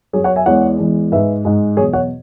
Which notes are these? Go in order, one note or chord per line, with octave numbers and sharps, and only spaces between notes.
F#2 F#3 G#4 C#5
C#5 F#5
E5 G#5
E2 E3 G#3 C#5 F#5
E2 E3 G#3
G#2 G#3 B4 E5
G#2 G#3
E2 B2 F#3 G#4 C#5
C#5 F#5